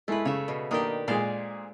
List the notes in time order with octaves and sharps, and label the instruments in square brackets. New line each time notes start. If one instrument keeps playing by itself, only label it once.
[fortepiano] G#3 E4 [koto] A3 B4
[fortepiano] C#3 [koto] C#5 E5
[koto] B2
[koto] D#3 D4 G4 [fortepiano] A#3 D#6
[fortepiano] A#2 G#3 G#4 [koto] C5 D5 F5